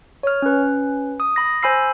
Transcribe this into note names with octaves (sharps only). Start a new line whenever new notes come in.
C#5 F6
C#4 B4
D#6
B5 A#6
C5 G#5 B5 E6 C7